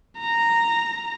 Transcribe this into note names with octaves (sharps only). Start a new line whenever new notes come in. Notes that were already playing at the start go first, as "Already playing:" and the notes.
A#5